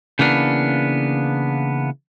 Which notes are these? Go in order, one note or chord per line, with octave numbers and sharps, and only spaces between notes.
C#3 E3 A#3 B3 D4